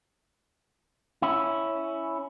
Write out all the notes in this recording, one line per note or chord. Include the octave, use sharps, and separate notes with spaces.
C#4 E4